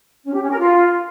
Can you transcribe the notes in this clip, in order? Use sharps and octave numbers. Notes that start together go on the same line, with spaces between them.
C#4
G4
C#4
A#4
F4